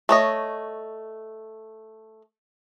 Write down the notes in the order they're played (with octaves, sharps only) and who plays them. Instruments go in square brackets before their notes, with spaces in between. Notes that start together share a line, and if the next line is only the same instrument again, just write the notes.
[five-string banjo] A3 C#5 D#5